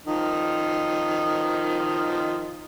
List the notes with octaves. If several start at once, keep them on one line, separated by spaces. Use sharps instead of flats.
D#3 F3 D#5